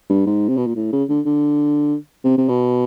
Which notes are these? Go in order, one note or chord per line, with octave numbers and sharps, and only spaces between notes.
G2
G#2
C3
B2
A#2
A2
C#3
D3
D3
C3
C3
B2